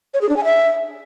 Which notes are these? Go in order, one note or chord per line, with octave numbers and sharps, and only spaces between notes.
C#5
G#4
D4
G#5
E5